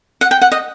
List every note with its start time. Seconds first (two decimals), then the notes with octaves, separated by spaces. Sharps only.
0.21 F#5
0.31 G5
0.41 F#5
0.52 D#5